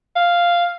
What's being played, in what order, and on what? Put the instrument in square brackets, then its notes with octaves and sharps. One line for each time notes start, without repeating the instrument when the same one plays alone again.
[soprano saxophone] F5